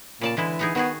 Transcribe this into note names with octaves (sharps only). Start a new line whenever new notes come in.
A#2 C#3 D5 A5
D3 E3 G#3 E4
B3 D#4 G#4
D#3 B3 F#4 G#4